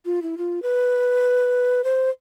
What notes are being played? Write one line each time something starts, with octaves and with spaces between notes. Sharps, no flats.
F4
E4
F4
B4
C5